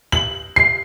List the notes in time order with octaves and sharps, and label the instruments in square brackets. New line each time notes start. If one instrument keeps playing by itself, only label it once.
[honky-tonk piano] F#7
C7